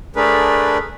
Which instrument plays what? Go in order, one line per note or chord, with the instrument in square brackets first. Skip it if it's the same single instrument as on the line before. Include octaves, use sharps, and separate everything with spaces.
[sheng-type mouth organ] A3 D4 G#4 A#4 B4